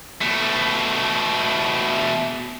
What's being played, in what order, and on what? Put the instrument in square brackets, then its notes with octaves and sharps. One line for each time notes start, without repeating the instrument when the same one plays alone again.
[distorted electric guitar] B2 A3